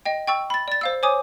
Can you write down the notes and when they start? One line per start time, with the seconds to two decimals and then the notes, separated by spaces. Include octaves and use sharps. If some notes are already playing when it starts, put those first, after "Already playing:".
0.05 D#5 G5
0.27 G5 C#6 E6
0.50 B5 A6
0.68 D5 A6
0.81 C5 F5 E6
1.03 C5 C#5 G#5 D6 D#6